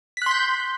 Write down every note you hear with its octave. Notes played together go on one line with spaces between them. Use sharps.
C6 F#6 G6 B6